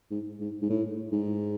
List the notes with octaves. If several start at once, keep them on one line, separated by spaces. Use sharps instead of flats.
G#2
G#2
G#2
A2
G#2